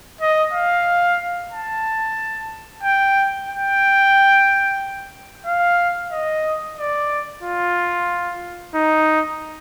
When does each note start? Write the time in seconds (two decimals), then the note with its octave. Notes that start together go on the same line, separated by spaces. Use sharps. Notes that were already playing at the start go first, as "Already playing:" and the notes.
0.21 D#5
0.53 F5
1.52 A5
2.83 G5
3.49 G5
5.46 F5
6.11 D#5
6.78 D5
7.43 F4
8.75 D#4